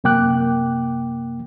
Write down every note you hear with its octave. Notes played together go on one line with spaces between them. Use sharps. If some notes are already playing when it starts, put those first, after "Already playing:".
F#2 C3 A#3 G5 D6 F#6